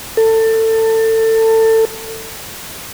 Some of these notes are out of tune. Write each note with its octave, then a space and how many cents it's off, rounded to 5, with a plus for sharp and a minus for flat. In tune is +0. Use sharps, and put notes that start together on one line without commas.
A4 +25